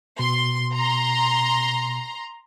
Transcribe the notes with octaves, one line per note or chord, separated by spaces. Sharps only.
B2 C6
A#5 C6